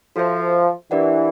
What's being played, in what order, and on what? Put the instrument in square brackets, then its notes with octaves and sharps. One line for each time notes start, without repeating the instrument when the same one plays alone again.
[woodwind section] F3 [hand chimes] F#4 A4 C5 E5
[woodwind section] E3 [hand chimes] D4 G4 A#4 D5 F#5